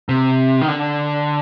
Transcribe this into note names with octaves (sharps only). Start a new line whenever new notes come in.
C3
D#3
D3